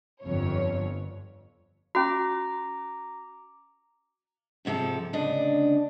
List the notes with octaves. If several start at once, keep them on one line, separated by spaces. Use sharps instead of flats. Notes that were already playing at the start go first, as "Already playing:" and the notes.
G1 F2 C#5
C#4 F#4 A#5 D6
F2 G#2 C3 F3 A4
D2 C#3 D4 D#5